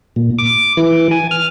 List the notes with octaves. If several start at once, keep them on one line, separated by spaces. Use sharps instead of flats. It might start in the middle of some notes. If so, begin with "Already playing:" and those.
A#2
D6
E3
G#5
F6